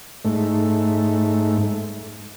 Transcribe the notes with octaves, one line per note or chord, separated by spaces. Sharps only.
G#2 A3